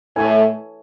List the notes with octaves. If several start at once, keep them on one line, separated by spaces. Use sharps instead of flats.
A2 E4 A4 C#5 G#5